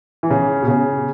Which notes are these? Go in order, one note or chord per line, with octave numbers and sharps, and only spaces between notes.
E3
C#3
B2
C#3